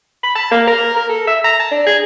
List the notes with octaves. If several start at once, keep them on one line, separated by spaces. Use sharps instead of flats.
B5
A5
A#3
A#4
A#4
A4
E5
A#5
A5
D4
G#4